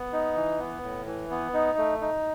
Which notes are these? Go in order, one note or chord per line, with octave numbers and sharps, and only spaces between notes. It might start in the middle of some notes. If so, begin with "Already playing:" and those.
Already playing: B3
D#4
E3
B3
A2
E3
B3
D#4
A3
D#4